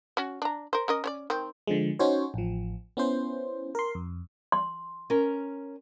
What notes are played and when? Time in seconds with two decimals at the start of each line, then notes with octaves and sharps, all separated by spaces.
0.17 C#4 F#4
0.42 D4 A#5
0.73 A#4 C5
0.88 C#4 A#4 D#5
1.04 C#4 C#5 D5
1.30 D#3 C4
1.67 D3 F3 G#3
1.99 C#4 D#4 F#4 C5 C#5
2.34 A1 F3
2.97 B3 C#4 E4 C5
3.75 A#4 C6
3.95 F2
4.52 C6
5.10 C#4 A#4